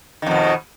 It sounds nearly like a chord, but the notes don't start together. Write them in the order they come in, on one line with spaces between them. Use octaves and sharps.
D#3 F2 B2